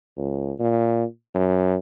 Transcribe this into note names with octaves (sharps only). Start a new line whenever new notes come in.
C#2
A#2
F#2